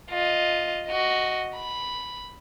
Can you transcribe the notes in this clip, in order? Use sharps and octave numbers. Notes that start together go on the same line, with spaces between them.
F4 D#5
F#4 D#5
B5